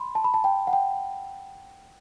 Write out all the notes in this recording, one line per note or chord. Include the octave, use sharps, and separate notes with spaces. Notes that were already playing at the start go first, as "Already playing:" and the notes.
Already playing: B5 C6
A5
B5
A5
G5
F#5
G5